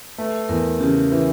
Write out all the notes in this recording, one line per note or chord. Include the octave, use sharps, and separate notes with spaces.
A3 B4
E2 A#4
C#3 G4
E3